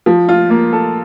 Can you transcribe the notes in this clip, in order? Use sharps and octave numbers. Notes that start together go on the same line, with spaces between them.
F3
F4
A#3
A4